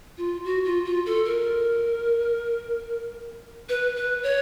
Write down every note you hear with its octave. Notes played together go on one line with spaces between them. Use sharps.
F4
F#4
F4
F4
A4
A#4
B4
B4
C#5